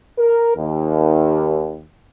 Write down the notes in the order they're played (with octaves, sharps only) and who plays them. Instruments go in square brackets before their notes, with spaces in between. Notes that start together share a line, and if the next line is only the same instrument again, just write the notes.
[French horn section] A#4
D#2